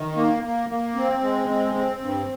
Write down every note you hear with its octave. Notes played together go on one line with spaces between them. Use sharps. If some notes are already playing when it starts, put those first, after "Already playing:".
Already playing: D#3
A#3
A#3
A#3
C4
G#3
C4
C4
G2